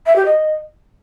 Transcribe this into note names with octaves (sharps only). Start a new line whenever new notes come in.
E5
G4
D#5